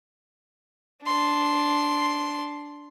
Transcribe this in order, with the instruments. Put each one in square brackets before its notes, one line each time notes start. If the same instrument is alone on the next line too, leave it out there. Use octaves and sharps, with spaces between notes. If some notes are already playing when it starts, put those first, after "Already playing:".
[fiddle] D4 C6